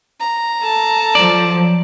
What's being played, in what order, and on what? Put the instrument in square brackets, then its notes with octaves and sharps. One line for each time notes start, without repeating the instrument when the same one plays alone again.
[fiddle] A#5
[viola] A4 A5
[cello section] F3 F#3 [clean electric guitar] D5